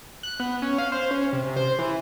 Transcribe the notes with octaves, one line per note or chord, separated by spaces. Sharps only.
F#6
B3
C#4
F5
C5
C#4
C3
C5
E3